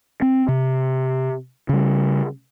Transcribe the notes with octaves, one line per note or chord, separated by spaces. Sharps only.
C4
C3
C#3 G3